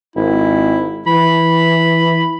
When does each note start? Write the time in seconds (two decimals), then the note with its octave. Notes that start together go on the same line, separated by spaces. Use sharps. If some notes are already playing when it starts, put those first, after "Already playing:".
0.16 G#1 E4
1.07 E3 B5